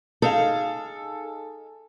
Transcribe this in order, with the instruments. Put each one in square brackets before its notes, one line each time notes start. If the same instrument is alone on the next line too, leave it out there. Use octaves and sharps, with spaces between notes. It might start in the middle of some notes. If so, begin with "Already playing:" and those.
[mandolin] D#4 G#4 F5 [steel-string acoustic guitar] A4